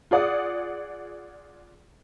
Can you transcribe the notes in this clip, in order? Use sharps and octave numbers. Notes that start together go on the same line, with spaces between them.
F4 G#4 D5 F#5 D#6